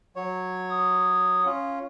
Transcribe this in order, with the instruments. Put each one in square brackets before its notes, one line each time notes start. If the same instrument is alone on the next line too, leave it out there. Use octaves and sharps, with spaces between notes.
[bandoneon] F#3 C#5
[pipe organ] D#6
[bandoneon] C#4 F4